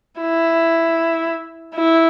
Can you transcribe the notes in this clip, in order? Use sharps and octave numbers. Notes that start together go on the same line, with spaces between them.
E4
E4